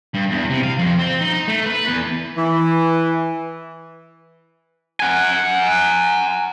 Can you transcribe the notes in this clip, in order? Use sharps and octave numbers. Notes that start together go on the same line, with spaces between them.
G2
E2
C3
F5
F2
C4
D#4
D#4
A3
B4
E2
E3
F#5 G#5